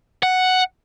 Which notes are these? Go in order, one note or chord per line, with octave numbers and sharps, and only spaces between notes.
F#5